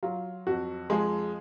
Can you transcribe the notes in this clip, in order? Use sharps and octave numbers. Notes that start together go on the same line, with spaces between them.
F#3 F4
F2 F#4
F3 G#3 G#4